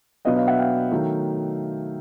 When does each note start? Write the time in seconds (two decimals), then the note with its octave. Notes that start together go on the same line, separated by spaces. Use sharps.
0.25 B2 F#3 B3 D4 D#5 F5
0.36 D#5 F5
0.47 E5 F#5
0.58 F5 G5
0.92 D#3 F#3 A3